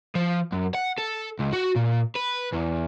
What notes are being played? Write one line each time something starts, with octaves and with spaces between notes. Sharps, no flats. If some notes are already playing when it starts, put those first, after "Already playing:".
F3
F#2
F#5
A4
C#2
F#4
A#2
B4
E2